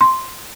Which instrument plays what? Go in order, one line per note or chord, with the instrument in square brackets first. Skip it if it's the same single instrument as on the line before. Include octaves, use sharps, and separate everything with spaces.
[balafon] C6